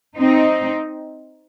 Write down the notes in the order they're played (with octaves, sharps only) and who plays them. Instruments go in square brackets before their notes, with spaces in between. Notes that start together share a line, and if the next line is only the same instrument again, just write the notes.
[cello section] C4 D#4